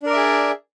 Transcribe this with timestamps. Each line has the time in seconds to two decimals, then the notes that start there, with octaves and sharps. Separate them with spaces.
0.03 D4
0.06 A#4
0.10 D5
0.13 E5
0.17 G#4